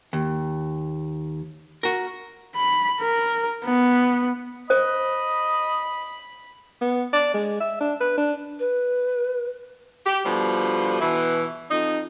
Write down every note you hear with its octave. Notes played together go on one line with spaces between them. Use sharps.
D#2
F#4 A#4
B5
A#4
B3
C5 D#5 B5
B3
D5
G#3
E5
D4
B4
D4
B4
G4
B2 D3 F3 G3
B2 E3
F2 D#4